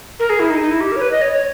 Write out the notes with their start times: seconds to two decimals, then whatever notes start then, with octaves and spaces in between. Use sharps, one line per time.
0.20 A#4
0.30 G#4
0.40 E4
0.50 D#4
0.60 D#4
0.71 E4
0.81 G4
0.92 A#4
0.96 C#5
1.01 B4
1.12 D#5
1.21 C#5
1.32 C#5